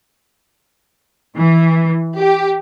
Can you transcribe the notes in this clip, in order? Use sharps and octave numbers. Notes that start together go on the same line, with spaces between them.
E3
G4